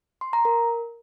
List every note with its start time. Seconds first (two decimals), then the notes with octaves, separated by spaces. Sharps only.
0.21 C6
0.33 A#5
0.45 A#4